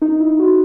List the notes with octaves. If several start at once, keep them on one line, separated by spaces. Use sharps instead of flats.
D#4
E4
F#4